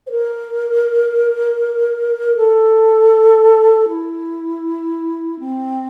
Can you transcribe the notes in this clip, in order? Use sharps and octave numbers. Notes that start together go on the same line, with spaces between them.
C5
A#4
A4
E4
C4